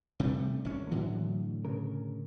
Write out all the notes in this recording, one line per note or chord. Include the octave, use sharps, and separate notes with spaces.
C3 G3 A3
G#1 C#4
A2 D3 E3 F#3
C#3 A#4